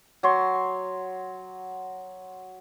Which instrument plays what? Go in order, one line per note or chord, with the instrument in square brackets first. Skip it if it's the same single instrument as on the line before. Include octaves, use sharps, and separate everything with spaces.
[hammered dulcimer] F#3 C#5 C6